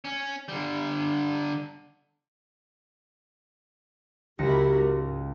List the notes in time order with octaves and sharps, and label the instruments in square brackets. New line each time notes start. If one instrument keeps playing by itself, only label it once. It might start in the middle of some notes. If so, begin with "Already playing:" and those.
[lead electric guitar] C#4
D3 G3
[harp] C#2 A#6 C#7 [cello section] E4 F#4 A#4 [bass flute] G4
[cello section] G#2